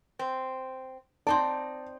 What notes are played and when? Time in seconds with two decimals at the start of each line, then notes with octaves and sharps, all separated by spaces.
0.19 C4
1.27 C4 D#4 D5 A5